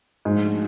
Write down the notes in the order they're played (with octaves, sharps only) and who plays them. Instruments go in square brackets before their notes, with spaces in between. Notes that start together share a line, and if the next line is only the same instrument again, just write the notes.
[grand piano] G#2 [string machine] F3 A3 D4 F#4